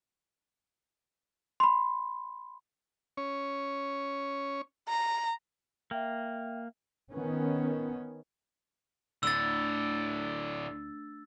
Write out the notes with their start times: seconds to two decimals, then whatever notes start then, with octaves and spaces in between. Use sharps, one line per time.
1.60 B5 C6
3.17 C#4 C#5
4.88 A#5
5.91 A#3 E5 G5
7.13 D#3 B3 C#4
9.23 D2 A2 D3 E6 A6